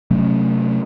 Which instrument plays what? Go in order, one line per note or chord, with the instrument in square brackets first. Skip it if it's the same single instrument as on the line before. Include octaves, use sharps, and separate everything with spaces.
[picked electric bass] C3 F#3 A3 C#4